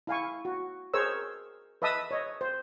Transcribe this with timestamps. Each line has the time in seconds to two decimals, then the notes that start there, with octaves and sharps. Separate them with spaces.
0.07 E4 F5 G#5 C#6
0.45 F#4
0.94 G#4 A#4 C5 C#5 E6
1.82 B4 D#5 E5 A5 D#6 E6
2.11 C#5 D#5
2.41 C5